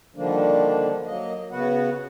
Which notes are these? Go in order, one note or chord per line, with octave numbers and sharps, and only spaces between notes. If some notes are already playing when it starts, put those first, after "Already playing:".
D3 D#3 F3 G3 A#3 D4
F#3 A#3 D#5
C#3 B3 F#4 B4 F#5